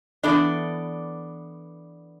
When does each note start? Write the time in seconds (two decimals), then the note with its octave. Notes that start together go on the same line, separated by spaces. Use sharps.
0.23 E3 B3 D4 A4 D5